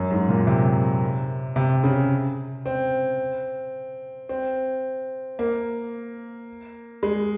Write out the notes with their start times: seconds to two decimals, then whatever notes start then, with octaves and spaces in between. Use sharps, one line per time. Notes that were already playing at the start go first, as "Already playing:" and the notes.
Already playing: F#2
0.11 G#2
0.29 A#2
0.47 C3
1.56 C3
1.84 C#3
2.66 C4
4.29 C4
5.39 A#3
7.03 G#3